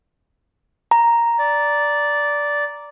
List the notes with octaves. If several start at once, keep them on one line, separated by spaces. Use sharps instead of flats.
A#5
D5